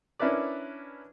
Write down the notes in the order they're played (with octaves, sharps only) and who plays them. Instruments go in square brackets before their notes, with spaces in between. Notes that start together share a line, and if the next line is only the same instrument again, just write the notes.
[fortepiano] C#4 D4 E4 A#4 B4 D5